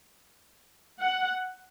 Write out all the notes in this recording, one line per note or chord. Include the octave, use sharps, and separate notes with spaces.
F#5